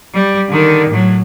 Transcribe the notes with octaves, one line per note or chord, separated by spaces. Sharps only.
G3
D3 D#3
A2 F#3